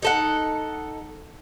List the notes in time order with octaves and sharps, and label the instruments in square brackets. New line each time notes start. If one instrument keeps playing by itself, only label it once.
[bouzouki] D#4 A4 F#5